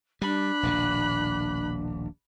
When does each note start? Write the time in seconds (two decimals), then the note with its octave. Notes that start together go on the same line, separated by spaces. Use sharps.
0.22 G3 D4 B5 F#6
0.63 D#1 A#1 B2